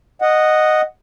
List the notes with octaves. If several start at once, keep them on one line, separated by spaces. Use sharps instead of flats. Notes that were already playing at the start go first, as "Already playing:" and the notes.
D#5 F#5